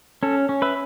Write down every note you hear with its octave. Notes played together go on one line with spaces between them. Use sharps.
C#4 A4
C#4
B4 E5